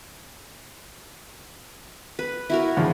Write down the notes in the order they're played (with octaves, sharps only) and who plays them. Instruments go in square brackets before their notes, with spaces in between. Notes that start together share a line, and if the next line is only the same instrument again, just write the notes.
[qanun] B4
E4 F#4 A#4
[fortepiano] E2 C#3 F3